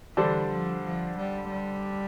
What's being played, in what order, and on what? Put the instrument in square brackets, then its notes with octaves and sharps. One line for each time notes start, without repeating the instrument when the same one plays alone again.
[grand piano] D3 G3 D4 A4 C5 [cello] E3
[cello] F3
F3
G3
G3